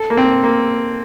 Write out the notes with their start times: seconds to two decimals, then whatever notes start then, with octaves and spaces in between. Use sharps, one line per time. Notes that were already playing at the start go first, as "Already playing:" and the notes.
Already playing: A4
0.10 A#3
0.17 C4
0.44 A#3